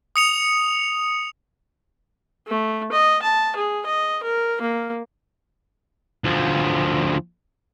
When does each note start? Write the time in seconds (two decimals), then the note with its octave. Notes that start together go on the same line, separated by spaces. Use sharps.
0.16 D#6 C#7 F7
2.48 A3
2.92 D#5
3.23 A5
3.56 G#4
3.86 D#5
4.23 A#4
4.62 A#3
6.24 D2 F3